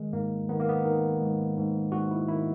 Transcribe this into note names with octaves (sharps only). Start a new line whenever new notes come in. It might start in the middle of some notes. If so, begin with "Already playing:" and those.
Already playing: D#3 G#3
G#2 A#3
D#3 B3
A#3
B3
D#3
G#2
G#2
G#2 F#4
E4
D#3 E4